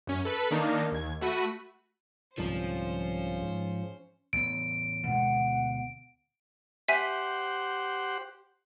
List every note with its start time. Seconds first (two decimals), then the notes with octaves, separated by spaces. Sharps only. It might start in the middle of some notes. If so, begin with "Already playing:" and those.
0.07 F#2 C#4
0.25 A4 B4
0.51 D#3 A#3 D4 D#4
0.92 D#2 G#6
1.21 A3 F#4 B5 D#7
2.38 C2 G#2 D3 F3 C#4 C5
3.42 G#2
4.33 A1 B3 D7
5.05 D2 B2 G#3 F#5
6.88 G4 C5 E5 F#5 G#5